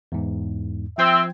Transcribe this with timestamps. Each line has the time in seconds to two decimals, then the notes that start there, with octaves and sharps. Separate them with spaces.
0.12 E2 G#2
0.98 F3 C4 E5 G5 G#6